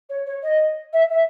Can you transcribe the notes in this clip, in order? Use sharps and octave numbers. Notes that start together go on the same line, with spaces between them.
C#5
C#5
D#5
E5
E5